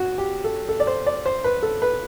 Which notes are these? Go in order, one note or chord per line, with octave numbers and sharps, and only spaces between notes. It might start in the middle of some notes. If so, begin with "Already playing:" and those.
Already playing: F#4
G4
A4
A4
D5
C5
D5
C5
B4
A4
B4